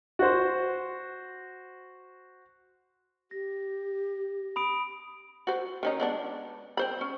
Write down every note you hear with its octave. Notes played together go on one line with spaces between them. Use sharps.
F#4 C5
G4 A#6
B5 D#6 D7
F#4 C5
D#3 C#4 D#4
G#3 B3 D4
C4 C5 B5
C#4